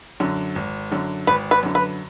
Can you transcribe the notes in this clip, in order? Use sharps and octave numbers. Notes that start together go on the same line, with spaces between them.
F#2 D3
G#1
F#2 D3
G#1 B4
B4
F#2 D3
B4